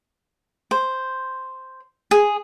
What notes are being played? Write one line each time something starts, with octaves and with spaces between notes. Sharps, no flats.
C5
G#4